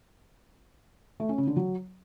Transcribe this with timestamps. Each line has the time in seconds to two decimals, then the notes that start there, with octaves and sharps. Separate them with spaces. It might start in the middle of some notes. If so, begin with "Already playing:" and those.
1.20 A3
1.29 C#4
1.38 C#3
1.47 D3
1.57 F#3